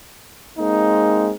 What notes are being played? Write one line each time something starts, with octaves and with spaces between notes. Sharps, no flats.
G#3 A#3 C4 D#4